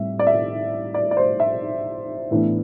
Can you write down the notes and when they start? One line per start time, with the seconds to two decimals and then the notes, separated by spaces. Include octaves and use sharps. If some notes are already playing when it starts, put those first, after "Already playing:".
Already playing: A2 G3 C4 E5
0.19 D5
0.27 E5
0.94 D5
1.11 D5
1.17 C5
1.40 E5
2.31 A2 E3 B3 D4